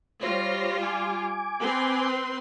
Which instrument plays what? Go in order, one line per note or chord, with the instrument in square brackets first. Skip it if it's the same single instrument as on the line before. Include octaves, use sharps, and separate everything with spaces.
[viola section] G3 F4 [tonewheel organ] C5 C#5 A#6
[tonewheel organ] G#5 D6
[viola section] C4 B4 C6